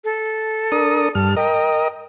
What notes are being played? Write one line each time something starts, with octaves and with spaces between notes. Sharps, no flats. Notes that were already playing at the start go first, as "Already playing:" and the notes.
A4
D4 A#4 D#6
G2 A5 F6
A#4 D#5 G5